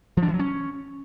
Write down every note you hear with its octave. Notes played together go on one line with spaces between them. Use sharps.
F3
D4
E3
F#3
C#4